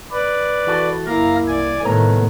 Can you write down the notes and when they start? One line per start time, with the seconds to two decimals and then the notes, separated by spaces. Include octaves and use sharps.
0.11 B4 D5
0.67 E3 F#4 A4
1.07 F#1 A#3 E4 F5 A#5
1.48 C2 D5 G#5
1.83 C2 A2 D#3 A3 B3 C#5 A#5